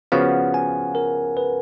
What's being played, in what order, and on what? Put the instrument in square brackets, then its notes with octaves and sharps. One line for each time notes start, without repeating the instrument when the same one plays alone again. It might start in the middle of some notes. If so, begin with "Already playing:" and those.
[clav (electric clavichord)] C#3 F3 B3 F#4 [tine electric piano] F#5
[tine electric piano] G#5
A#4
B4